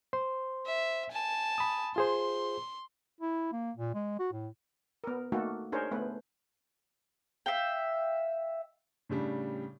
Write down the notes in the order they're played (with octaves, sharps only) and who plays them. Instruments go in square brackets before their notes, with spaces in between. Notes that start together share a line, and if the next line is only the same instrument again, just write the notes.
[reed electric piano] C5 C6
[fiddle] E5
G#5 A5
[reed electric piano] B5 D#6
[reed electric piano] F4 G#4 C5 [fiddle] C6
[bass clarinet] E4
A#3
A#2
G#3
F#4
A2
[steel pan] B3 A#4
A3 A#3 D#4 F#4 A4
D4 D#4 G#4 A#4 C5 C#5
A3 B3 B4
[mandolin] E5 F5 G5
[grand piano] A2 C#3 G3 D4